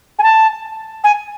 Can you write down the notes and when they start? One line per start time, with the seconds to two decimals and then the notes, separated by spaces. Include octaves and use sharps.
0.18 G#5
0.23 A5
1.03 G#5